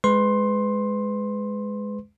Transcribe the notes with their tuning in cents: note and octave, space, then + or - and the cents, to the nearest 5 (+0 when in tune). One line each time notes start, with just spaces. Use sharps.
G#3 +0 B4 +25 C6 +15